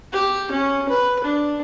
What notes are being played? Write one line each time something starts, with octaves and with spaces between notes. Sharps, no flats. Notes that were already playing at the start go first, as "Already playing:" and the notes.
G4
C#4
B4
D4